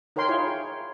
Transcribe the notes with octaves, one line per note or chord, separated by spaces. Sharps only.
D#4 A#4 C#5 G5 C6
E4 F4 G#4 C#5